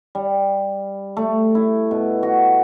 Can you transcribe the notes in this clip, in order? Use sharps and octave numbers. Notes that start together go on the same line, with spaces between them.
G3
A3
E4
B2
F#4